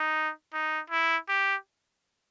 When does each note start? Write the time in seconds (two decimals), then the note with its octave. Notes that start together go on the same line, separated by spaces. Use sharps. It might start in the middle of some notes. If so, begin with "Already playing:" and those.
Already playing: D#4
0.53 D#4
0.90 E4
1.29 G4